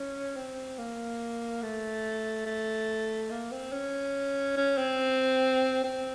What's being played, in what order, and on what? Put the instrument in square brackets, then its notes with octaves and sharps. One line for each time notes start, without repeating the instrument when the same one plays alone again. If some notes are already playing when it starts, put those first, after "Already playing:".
Already playing: [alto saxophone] C#4
C4
A#3
A3
A3
A#3
C4
C#4
C#4
C4
C4